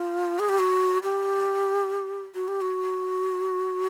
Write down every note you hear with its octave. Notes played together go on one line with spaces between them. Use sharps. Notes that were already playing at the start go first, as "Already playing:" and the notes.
Already playing: F4
G#4
G4
F#4
G4
F#4
G4
F#4